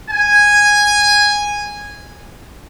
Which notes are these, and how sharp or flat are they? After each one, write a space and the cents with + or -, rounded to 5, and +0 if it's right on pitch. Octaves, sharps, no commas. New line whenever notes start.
G#5 -10